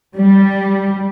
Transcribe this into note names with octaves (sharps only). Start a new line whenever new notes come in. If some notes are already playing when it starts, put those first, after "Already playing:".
G3